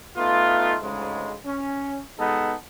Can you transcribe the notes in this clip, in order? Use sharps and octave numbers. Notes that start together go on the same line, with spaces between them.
A3 B3 D#4 F4
D2 G#2 C#3 G#3
C#4
B2 G#3 B3 D#4 A4